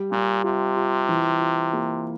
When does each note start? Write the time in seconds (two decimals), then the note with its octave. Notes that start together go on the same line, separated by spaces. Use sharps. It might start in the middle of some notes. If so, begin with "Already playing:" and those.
Already playing: G3
0.12 A#2 G3
0.44 C3 F4
0.77 F4
1.09 E3
1.41 F4
1.73 A#3